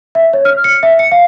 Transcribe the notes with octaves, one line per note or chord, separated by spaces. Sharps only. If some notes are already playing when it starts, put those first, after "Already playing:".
E5
C#5
F6
C#7
E5
C#7
F5